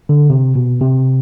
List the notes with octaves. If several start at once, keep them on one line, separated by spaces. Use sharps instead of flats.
D3
C3
B2
C3